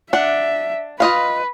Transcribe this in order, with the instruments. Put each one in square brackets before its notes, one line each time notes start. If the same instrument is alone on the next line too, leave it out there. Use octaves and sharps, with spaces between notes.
[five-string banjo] D4 F#5 [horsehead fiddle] E5
[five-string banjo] F4 D#5 F5 [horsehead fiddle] B4